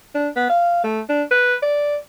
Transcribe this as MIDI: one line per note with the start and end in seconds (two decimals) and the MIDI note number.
0.15 0.29 62
0.36 0.46 59
0.50 0.80 77
0.84 1.01 57
1.09 1.23 62
1.31 1.55 71
1.62 1.96 74